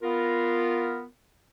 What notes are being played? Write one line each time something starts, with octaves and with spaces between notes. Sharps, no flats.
B3 F4 A#4